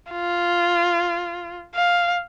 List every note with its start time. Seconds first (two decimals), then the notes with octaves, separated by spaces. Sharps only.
0.12 F4
1.75 F5